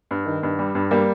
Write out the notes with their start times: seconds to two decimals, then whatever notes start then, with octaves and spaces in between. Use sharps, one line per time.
0.11 G2
0.26 D#3
0.43 G2
0.59 G3
0.75 G2
0.91 G3 A#3